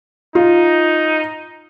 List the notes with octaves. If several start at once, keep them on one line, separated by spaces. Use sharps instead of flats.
D#4 F4